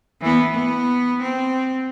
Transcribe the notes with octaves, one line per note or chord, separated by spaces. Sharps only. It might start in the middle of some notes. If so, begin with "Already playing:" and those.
E3 B3
B3
C4